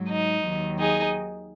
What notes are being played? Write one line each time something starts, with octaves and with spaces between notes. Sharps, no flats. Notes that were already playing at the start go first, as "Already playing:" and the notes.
Already playing: G#2 F#3
D#4
D#2 D#3 F#3
D#4 G#4